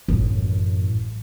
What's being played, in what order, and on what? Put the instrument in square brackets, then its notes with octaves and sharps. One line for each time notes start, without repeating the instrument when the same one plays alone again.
[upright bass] A1 F#2